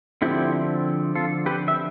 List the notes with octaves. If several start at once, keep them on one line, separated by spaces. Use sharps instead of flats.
D3 F3 C4 E4 G4
F4 A4
G4 B4
E5